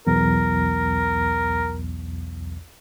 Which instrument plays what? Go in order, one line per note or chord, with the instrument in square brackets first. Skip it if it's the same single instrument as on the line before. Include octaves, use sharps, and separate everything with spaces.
[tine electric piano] B1 E2 [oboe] A#4